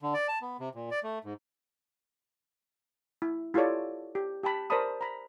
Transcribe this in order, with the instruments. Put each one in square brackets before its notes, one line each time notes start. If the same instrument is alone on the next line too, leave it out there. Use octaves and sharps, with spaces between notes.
[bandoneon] D3
D5
A5
B3
C3
A#2
D5
A3
G#2
[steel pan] E4
E4 F4 G4 A4 C#5 D5
G4
G4 G5 A5 B5
A#4 C5 D5 A5 B5 D#6
A#5 B5